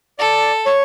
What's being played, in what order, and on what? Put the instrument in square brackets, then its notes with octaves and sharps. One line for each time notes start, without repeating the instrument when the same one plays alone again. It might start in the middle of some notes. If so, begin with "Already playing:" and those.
[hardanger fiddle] A4 [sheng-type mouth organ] D5
[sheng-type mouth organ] C#5